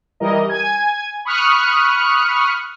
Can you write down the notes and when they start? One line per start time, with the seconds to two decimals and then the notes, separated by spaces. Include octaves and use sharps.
0.20 E3 G3 A#4 D#5
0.49 G#5 G#6
1.25 B5 C#6 D#6 F6 F#6 C#7